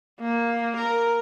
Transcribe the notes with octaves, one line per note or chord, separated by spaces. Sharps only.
A#3
A#4